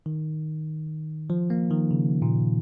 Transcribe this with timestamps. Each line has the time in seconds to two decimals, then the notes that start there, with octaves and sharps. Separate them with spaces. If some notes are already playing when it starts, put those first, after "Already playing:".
0.06 D#3
1.30 F3
1.50 A#3
1.70 D#3
1.91 C#3
2.22 A#2